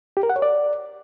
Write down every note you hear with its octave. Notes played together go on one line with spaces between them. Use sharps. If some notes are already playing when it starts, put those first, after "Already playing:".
G4
A#4
F#5
C#5
D5